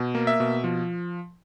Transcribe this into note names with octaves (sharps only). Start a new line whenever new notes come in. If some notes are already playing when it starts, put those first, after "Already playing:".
Already playing: B2
A#3
E5
B2
F3